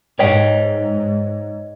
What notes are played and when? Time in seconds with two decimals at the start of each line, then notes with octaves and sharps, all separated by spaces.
0.19 G#2 C#5 D#5 G5